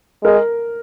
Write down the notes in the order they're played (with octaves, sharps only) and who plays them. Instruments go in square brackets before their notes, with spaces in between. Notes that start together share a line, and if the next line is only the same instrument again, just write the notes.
[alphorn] G#3 [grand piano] A#4